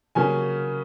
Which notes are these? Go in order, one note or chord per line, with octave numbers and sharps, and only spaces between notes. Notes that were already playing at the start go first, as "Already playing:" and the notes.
C#3 F#3 A#3 C#4 G#5